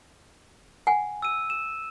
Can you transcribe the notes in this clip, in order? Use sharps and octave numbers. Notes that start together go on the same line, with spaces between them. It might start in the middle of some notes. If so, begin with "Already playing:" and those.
F#5 G#5
E6 D#7
E7